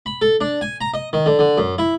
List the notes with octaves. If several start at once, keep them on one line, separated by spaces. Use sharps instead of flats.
B5
A4
D4
G#5
A#5
D#5
D#3
D3
D3
F#2
E4